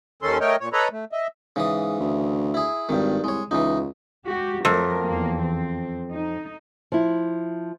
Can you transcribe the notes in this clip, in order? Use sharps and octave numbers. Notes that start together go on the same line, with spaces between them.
D#2 D#3 C#4 A4 C6
A3 A#4 C#5 D#5 G5
A#2 C#5
A4 B4 C#5 D#5 A#5 B5
A3
D#5 E5
G#2 C#3 E3 D#6
D2
E4 G#4
G#1 G2 D#3
C2 G#3 C#5
C#2 E3 D#4
G#3 F#4 G4
F2 F#3 A3 A#4
E2 A#3
C4
D#4
F3 E4